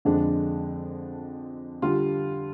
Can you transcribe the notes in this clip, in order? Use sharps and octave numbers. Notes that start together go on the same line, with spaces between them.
F2 D3 F3 G#3 D4
D3 G3 F4